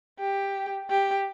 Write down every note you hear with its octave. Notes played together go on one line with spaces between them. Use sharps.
G4
G4